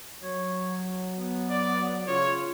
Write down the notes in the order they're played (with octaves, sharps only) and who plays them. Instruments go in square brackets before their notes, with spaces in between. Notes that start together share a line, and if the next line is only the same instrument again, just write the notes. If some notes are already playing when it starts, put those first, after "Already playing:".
[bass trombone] F#3 [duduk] C#5
[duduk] B3
[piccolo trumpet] D5
[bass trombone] C#3 [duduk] F4 [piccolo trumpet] C#5